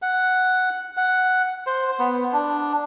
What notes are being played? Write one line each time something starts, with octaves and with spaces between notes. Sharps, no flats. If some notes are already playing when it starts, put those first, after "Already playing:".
F#5
F#5
C5
B3
D4